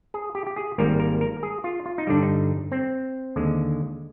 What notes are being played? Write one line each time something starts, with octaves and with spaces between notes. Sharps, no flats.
G#4
G4
G4
G#4
G#1 G#2 G3 A#3 A#4
A#4
A#4
G#4
F4
F4
D#4
G2 D3 G3 D4
D#4
C4
D#2 D3 G#3